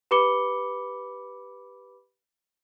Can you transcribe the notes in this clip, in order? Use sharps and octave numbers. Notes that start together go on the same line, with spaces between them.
G4 B4 B5 D6 C#7 G7